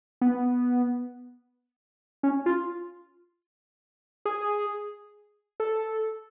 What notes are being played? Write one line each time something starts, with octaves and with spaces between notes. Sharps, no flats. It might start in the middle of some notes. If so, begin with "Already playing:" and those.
B3
C#4
F4
G#4
A4